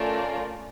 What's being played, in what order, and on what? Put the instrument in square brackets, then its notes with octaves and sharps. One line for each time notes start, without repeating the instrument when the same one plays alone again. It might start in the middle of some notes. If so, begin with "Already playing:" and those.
Already playing: [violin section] A3 C#4 F4 A#4 D5